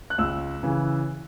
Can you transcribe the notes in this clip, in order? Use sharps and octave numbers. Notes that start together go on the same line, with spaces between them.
F#6
C#2 E6
C#3 E3